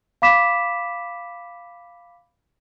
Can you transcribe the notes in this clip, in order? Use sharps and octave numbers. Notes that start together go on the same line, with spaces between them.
F5 B5 D6 B6 E7